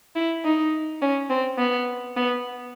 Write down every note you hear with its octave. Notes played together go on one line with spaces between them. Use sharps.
E4
D#4
C#4
C4
B3
B3